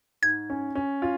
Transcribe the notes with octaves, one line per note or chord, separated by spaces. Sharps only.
G#2 G#6
C#4
C#4
F4